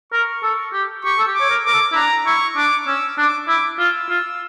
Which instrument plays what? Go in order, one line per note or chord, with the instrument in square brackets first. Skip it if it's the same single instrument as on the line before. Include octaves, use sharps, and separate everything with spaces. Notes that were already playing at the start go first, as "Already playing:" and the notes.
[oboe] A#4 [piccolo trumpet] C#6
[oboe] A4
G4
[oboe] G4 [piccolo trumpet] C#6
[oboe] A4
G4
[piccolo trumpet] D6
[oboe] C#5
A#4
[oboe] A#4 [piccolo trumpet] D6
[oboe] A4
E4
[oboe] D4 [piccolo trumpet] A#5
[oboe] E4 [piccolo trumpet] C#6
[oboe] D4 [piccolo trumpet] D6
[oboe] C#4 [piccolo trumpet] E6
[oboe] D4 [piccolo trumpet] D6
[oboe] E4 [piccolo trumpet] D6
[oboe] F4 [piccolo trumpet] E6
[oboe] F4